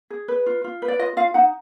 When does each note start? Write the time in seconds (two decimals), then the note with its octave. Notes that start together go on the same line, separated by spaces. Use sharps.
0.10 G#4
0.28 B4
0.46 F4
0.64 F4
0.82 B4
0.88 D5
0.99 F4 D#5
1.17 F4 F5
1.34 D#4 F#5